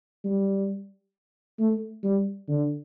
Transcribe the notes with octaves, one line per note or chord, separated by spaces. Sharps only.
G3
A3
G3
D3